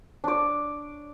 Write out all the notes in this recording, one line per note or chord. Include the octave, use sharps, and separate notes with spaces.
D4 D5